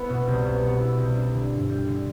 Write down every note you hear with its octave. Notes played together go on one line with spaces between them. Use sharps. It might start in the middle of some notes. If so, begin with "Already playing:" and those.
Already playing: B3 E4
B2
C2
B2
B3
E4
C2
D4
D3
G2
G3
D3